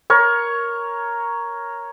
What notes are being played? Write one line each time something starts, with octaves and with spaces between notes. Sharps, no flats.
A#4 C#5